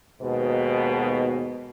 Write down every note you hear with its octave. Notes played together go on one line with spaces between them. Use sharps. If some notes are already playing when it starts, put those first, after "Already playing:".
D#2 G#2 B2